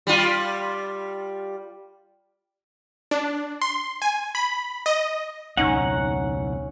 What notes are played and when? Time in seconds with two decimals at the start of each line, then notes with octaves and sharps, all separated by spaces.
0.07 G3 F4
3.11 D4
3.62 C6
4.02 G#5
4.35 B5
4.86 D#5
5.57 C#2 B2 C#4 D#4 F#5